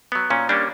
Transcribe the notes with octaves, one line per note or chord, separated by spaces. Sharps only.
F#3 B3
A#2 C#4
G3 A#3 C#4 D4